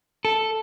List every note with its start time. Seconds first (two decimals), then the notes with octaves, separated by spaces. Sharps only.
0.25 A4